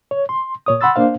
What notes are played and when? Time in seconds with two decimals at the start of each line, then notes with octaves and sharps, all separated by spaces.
0.11 C#5
0.29 C6
0.66 A#2 C#5 D#6
0.81 F#5 B5 C6 E6 A6
0.96 A#3 D4 C5 F5